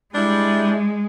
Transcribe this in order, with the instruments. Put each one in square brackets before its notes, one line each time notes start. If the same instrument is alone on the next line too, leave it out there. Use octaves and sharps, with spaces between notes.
[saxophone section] G3 D4 E4 [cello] G#3